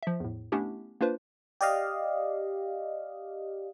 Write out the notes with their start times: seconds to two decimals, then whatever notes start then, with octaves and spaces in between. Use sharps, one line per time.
0.03 F3 E5
0.20 E2 A2
0.52 A3 B3 C#4 D4 E4 G4
1.01 A#3 D4 F4 B4 C5
1.61 G4 D5 D#5 F5